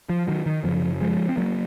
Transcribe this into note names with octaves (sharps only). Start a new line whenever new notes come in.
F3
D#3 F#3
D#3
F#2 C#3 F3
F3 G#3
C4
F#3 A#3